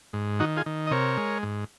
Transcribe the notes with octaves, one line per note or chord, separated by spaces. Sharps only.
G#2
D#3 D#4 F#4
F4 G#4
D#3
D#5
C3 A#4 C#5
G#3
G#2